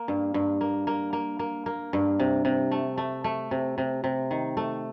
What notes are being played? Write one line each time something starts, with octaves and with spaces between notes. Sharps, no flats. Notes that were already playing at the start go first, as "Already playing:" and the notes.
Already playing: A#3
G2
G2
A#3
A#3
A#3
A#3
A#3
G2
C3
C3
A3
A3
A3
C3
C3
C3
D#3
A3